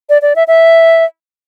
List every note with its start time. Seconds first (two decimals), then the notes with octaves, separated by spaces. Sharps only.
0.09 D5
0.22 D5
0.36 E5
0.48 E5